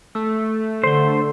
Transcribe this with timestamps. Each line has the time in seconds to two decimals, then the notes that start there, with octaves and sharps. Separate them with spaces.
0.15 A3 E6
0.83 D3 C5 C6 G7